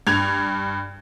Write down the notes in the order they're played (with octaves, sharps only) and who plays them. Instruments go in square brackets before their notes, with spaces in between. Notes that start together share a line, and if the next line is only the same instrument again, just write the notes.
[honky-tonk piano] G2 G#6 F7